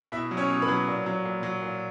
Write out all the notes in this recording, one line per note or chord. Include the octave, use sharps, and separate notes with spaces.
B2 E4 E5
F#3
C#4 C#5
B2
B4 B5
F#3
A#2
F#3
A#2
F#3
A#2